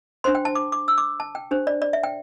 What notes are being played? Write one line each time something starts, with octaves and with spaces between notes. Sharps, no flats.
D4 C5 C6
G5
A5
D6
D6
E6
D6
A5
G5
D4 G4 C5
D5
D5
E5
G5